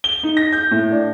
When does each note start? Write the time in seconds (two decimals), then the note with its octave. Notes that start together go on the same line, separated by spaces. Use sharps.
0.04 G7
0.23 D#4
0.37 A#6
0.52 G6
0.71 A2
0.91 D4